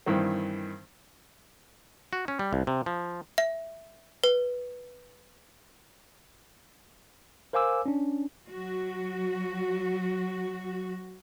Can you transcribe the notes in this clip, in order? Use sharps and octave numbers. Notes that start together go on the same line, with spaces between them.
G2 D#3 E3 C4
F#4
C#4
G3
C2
C3
F3
E5
B4
A#4 C5 F5 G#5 D6 E6
C#4 D4
F#3 F#4